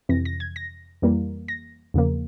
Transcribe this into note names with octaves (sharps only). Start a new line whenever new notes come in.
F2 C3 E3 A#6
A#6
G#6
A#6
F2 E3 G3 A#3
A#6
E2 C#3 F3 A#3